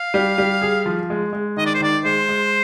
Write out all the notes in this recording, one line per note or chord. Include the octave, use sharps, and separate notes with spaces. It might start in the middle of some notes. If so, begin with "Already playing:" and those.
Already playing: F5
G3
G3
G#4
F3
G#3
G#3
D#3 D#5
D5
C5
D#3 D5
G#3 C5
G#3